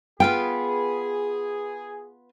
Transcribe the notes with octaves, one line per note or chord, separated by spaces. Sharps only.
B3 F4 G#4 B4 G5